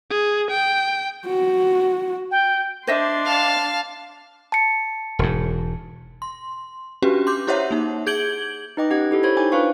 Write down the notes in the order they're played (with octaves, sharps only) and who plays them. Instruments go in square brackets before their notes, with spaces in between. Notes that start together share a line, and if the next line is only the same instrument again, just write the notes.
[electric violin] G#4
G5
[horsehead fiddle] F#4
[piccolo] G5
[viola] D4 C6 [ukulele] C5 D#5 E5
[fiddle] F5 A5
[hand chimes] A5 C#7
[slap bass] E1 G#2
[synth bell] C6
C#4 D4 F#4 G4 B4
C6 D6 G6
E4 G4 C5 C#5 E5 F#5
A#3 D#4
G#4 G6 G#6 D7 F#7 G7
[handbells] D#4 B4 D#5 G5 D6
C#4 G4 D#5 F#5 G#6
E4 G4 A4
C5 C#5 B5 C6 G#6
D#4 G5 G#5 D6
D4 F4 B4 C5 F5 C#6